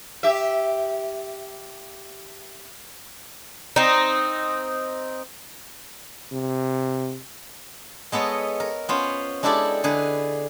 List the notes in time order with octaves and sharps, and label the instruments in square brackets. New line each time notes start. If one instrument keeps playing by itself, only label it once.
[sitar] G4 E5
[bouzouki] C4 D#4
[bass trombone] C3
[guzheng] G#3 B3 A4 C#5 D#5
A#4
B3 C#4 F4 C5
G#3 D4 E4 G4 A4 D5
D3 G#4 B4